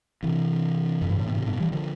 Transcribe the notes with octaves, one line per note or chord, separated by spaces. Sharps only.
C3 E3
F2
G2
A2
B2
A2 C3
G2 B2
E3 G3
D3 F3